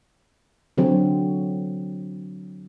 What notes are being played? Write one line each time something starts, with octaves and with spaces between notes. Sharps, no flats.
D3 F#3 C4